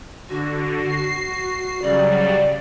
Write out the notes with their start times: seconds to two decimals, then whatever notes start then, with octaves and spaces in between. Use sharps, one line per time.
0.29 D3 F#4
0.85 C7
1.82 C#3 F#3 G3 D5